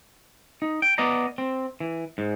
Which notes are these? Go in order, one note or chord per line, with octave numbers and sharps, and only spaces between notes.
D#4
G5
B3 D5 D#5 A#5
C4
E3
G#2